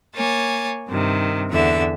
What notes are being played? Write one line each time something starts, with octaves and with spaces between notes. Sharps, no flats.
A#3 C#5 G#5 A6
G2 C3 D#3
E2 D3 E5